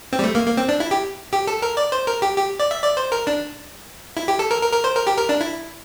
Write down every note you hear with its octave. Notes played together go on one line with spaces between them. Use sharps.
C4
G3
A3
A#3
A#3
C4
D4
E4
G4
G4
A4
A#4
D5
C5
A#4
G4
G4
D5
E5
D5
C5
A#4
D4
E4
G4
A4
A#4
A#4
A#4
C5
A#4
G4
A#4
D4
E4